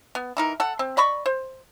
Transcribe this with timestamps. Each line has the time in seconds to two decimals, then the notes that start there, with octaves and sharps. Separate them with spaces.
0.15 B3
0.37 E3 D#4 A#4
0.60 A4 F#5
0.79 C4
0.97 D5 D#5 B5 C#6
1.26 C5